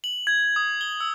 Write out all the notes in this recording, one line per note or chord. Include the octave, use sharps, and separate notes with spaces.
F#7
G#6
D#6
G7
E6